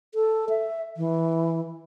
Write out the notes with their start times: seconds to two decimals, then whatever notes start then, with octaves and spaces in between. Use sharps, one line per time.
0.15 A4
0.49 E5
0.97 E3